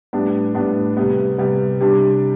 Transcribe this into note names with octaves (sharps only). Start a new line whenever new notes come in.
A2 G3 B3 D4
A2 G3 B3 D4
C3 G3 B3
C3 G3 B3
C3 G3 D4